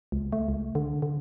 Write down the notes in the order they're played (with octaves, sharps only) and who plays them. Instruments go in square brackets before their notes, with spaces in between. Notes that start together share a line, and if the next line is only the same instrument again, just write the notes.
[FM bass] C#2
A3
C#2
D3
D3